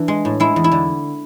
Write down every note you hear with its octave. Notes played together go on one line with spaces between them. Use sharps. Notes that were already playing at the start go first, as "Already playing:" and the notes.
Already playing: E3 D4
G#3
A2
G#3 E4
E2
E4
D3